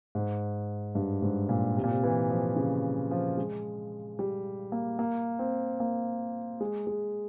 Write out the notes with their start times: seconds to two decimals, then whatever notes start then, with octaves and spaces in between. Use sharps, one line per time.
0.15 G#2
0.95 G2
1.22 G#2
1.49 A#2
1.77 C3
1.84 A#2
1.91 C3
2.03 E3
2.30 F3
2.56 C#3
3.11 F3
3.37 G#3
4.19 G3
4.72 A#3
4.99 A#3
5.39 C4
5.80 A#3
6.61 G#3
6.87 G#3